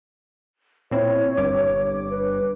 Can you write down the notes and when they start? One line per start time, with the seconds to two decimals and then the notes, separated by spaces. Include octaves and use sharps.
0.91 A#2 C4 E4 C#5
1.37 G1 G2 D6
2.11 B4